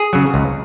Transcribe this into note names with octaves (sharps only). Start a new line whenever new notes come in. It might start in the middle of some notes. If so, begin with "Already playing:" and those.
Already playing: G#4
C#3 F#3
C#2